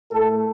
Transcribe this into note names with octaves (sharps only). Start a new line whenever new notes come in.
A2 A3 A4